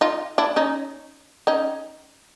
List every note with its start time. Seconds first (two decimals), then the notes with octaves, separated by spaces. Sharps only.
0.01 D#4 F4
0.38 D4 E4
0.56 C#4 D#4
1.47 C#4 D#4